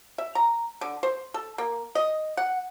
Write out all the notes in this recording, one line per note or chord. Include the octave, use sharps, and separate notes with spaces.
E5
A#5
D3
C5
A4
A#3
D#5
F#5